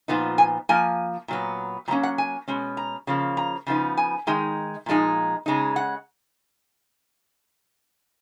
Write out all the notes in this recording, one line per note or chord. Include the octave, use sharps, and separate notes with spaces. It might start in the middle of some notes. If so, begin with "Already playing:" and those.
A#2 F3 B3 D#4
G#5
F3 A#3 G#5
A#2 F#3 B3
A#2 F#3 A#3 C#4 A#5
F#5
G#5
B2 G#3 C#4
A#5
C#3 F3 A#3
A#5
C#3 F3 B3 D#4
G#5
D#3 G#3 D#4
A#2 F3 G#3 D#4
C#3 G#3 D#4
F#5